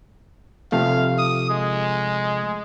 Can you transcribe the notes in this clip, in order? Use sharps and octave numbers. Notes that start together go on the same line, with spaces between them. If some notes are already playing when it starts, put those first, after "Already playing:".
C3 F3 A3 F5
D#6
G#3